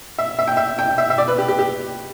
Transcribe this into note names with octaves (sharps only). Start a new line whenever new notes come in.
E5
E5
G5
E5
G5
E5
E5
D5
B4
G4
G4
G4